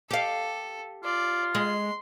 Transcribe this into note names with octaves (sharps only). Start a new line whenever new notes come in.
G4 A4 F5
F4 D5
G#3 C6